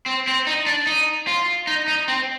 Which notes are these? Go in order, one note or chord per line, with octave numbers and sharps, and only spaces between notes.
C4
C4
D#4
D4
D#4
F4
D#4
D#4
C4